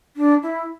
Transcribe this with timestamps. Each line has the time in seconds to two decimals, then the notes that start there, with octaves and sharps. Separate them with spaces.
0.17 D4
0.43 E4